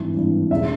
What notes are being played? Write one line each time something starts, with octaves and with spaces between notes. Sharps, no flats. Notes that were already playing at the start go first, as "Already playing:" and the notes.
Already playing: G#1 G2 E3
G#1 G2 E3
E1 C#3 E5